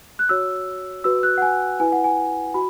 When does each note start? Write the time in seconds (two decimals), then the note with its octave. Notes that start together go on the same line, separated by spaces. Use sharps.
0.19 F#6
0.29 F#4 C#5 E6
1.04 F#4 B4 E6
1.23 F#6
1.38 F#5
1.42 G#5
1.80 E4 B4 G#5
1.92 F#5
2.04 G#5
2.54 F#4 B5